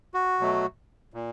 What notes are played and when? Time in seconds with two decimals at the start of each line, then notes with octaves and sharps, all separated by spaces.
0.14 F#4
0.39 B2 F#3 A3
1.14 A#2